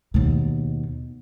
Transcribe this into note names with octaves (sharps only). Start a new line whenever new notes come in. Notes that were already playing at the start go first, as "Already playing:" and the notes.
D#2 B2